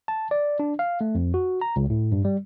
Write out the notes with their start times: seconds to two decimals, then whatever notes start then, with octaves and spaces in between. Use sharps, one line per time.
0.08 A5
0.31 D5
0.59 D4
0.79 F5
1.01 A3
1.15 F2
1.34 F#4
1.61 A#5
1.76 C#2
1.90 A2
2.12 G2
2.25 G3